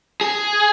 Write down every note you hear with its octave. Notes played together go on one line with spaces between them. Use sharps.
G#4